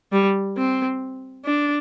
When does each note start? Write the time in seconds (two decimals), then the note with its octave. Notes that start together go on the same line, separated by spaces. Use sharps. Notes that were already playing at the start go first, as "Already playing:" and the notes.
0.12 G3
0.57 C4
1.45 D4